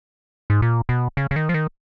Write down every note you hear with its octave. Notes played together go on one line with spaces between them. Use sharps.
G#2
A#2
B2
C#3
C#3
D#3
F3
D#3